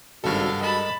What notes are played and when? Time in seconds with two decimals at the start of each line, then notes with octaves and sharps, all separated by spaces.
0.24 G#1 G2 C#3 G3 F#4 A4 F5
0.61 G#3 A#4 D#5 A5 B5